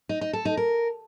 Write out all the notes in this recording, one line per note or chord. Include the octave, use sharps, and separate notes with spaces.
D#4
D#4
A4
D#4
A#4